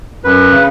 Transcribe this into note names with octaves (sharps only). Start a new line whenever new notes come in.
F#2 B4
C#3